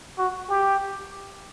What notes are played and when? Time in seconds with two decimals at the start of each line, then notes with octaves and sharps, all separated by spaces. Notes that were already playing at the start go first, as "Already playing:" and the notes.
0.18 F#4
0.49 G4